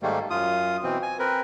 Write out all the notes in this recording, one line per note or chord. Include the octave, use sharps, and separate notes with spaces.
G#2 D#3 G3 A3 A#3
F#2 F4 D#6
B2 E3 C4
G#5
C4 A#4 B4